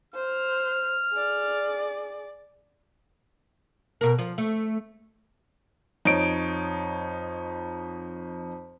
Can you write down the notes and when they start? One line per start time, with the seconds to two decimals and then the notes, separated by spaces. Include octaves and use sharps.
0.14 C5 F6
1.14 G#4 D5
4.01 B2 A#4
4.19 F3
4.38 A3
6.05 F2 D#4 C#5 D7